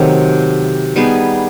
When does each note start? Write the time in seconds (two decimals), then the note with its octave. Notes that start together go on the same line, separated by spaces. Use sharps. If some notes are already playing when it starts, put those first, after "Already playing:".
Already playing: C3 D#3 F#3 A3
0.96 G3 B3 D#4 G#4